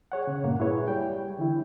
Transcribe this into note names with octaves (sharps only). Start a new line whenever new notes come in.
G#4 C#5 F#5
C#3
G2 A#2 A#3 F#5
E4 G#4 B4 C#5
G3 G5
D3 E3 E4